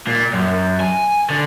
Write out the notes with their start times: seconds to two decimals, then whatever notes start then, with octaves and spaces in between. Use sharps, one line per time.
0.07 A#2
0.33 F#2
0.80 G#5
1.30 D3